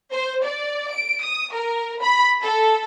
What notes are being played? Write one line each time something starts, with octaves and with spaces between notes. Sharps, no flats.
C5
D5
D7
D#6
A#4
B5
A4